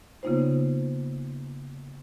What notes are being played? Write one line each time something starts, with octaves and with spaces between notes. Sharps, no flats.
C#3 A#3 B3 D#4 F4 C5